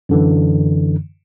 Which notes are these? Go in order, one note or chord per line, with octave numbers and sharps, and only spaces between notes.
F#2 D3 E3